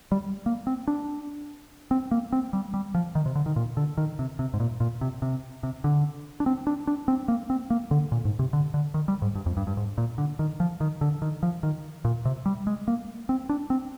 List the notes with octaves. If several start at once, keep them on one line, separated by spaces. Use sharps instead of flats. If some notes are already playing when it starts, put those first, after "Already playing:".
G3
A#3
C4
D4
C4
A#3
C4
G3
G3
F3
D#3
C3
D3
D#3
A#2
D3
D#3
C3
C3
G#2
A#2
A#2
C3
C3
C3
D3
D4
C4
D4
D4
C4
A#3
C4
A#3
D3
A#2
G#2
C3
D3
D3
D#3
G3
G#2
G2
F2
G2
G2
G#2
A#2
D3
D#3
F3
D#3
D3
D#3
F3
D#3
A#2
C3
G3
G#3
A#3
C4
D4
C4